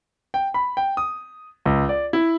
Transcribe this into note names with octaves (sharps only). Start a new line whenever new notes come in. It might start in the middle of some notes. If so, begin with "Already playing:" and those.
G5
B5
G5
D#6
C#2
D5
E4